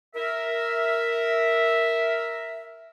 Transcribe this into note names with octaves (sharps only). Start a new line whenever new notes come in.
A#4 E5